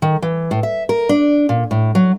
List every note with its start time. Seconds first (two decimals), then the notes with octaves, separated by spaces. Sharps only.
0.02 D#3
0.22 E3
0.51 A2
0.63 E5
0.89 A#4
1.09 D4
1.49 A#2
1.71 A2
1.95 F#3